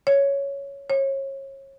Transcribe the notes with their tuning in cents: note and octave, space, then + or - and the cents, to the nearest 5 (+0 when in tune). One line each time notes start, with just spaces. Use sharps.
C#5 +5
C#5 -30